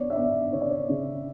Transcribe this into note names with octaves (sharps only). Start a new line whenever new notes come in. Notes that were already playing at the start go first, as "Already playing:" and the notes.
Already playing: B3 C#5 D5
E5
B3 D5
C#3 C#5
D5
C#5
C#3